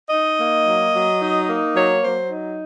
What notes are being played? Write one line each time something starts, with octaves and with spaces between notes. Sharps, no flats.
D#4 D#5
A#3
F#3
F#3
D#4
A#3
F#3 C#5
F#3 C5
D#4